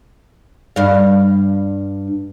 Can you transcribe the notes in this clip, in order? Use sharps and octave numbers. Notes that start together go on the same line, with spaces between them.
G2 F5